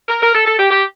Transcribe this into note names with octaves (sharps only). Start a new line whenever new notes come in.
A#4
A#4
A4
A4
G4
G4